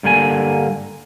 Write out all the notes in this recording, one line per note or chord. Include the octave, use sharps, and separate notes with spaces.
G2 D3 A#3 F#4 G#5